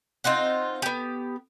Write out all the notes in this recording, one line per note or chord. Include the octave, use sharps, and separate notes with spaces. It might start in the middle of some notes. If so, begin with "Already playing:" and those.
C4 D#4 F4 F#5
B3 G4